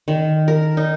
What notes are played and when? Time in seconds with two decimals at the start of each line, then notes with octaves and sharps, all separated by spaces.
0.08 D#3
0.48 A#4
0.77 D#4